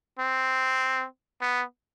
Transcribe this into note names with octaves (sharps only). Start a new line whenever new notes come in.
C4
B3